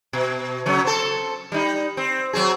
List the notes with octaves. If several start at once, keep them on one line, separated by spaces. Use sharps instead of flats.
B2
C#3 F#3 C#4
C4 A4
G3 D#4
C4
F#3 C4 G#4